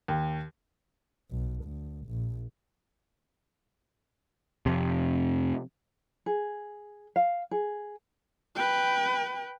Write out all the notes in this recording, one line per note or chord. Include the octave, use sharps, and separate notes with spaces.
D#2
B1
D2
A#1
F2 C3
G#4
F5
G#4
B4 G5